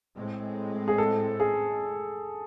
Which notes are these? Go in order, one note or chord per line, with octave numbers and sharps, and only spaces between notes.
A2 G#3 C4
G#4
A4
G#4